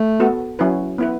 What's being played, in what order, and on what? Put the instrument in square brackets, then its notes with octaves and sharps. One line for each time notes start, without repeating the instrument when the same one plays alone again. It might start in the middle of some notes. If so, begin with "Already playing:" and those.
Already playing: [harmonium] A3
[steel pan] B3 F#4 A4
F#3 C#4 E4 B4
B3 E4 B4